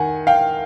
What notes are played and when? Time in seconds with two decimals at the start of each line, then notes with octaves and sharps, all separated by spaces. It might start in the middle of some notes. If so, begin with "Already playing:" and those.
Already playing: D#3 F#5 G#5
0.27 F5 G5